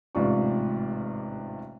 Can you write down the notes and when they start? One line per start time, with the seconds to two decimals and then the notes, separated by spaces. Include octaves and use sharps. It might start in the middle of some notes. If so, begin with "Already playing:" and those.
0.15 A1 G#2 C3 F4 D5 C#6